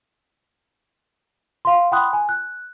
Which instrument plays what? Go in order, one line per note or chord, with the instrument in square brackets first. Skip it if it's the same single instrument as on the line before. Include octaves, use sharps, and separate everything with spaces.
[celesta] F5 C6
F#5 G5 B5 C6 D#6 F#6
G#5
F#6